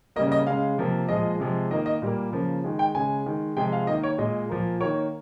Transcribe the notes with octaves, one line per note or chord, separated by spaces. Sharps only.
C#3 G3 A#3 D#5
D#5
C#3 G#3 F5
C3 F3 A#3
A#2 F3 G#3 D#5
C3 F3 G#3
D#3 A#3 D#5
D#5
A#2 G3 A#3
C#3 F3 A#3
D#3 G#3
G5
C#3 G#3 G#5
D#3 G#3
C3 F3 G#3 G5
F5
D#3 A#3 D#5
C#5
A#2 G#3 D#5
A#2 F3 A#3
D#3 A#3 C#5